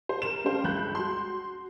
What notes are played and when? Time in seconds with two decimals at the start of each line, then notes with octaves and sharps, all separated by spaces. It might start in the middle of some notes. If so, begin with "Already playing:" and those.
0.09 C5
0.22 A#4 E7
0.44 C#4 D4 A4 C5 F5 G5
0.64 G1 C#2 B5 F#6 G6
0.95 F#4 C6